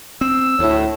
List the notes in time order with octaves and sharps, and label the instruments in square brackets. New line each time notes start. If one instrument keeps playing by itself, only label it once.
[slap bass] C4 [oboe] E6
[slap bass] D2 [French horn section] A2 C#5